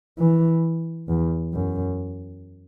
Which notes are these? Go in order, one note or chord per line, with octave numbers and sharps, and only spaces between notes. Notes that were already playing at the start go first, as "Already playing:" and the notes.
E3
E2
F#2